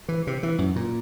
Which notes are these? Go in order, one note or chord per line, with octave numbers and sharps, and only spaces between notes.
E3
C3
E3
F#2
A#2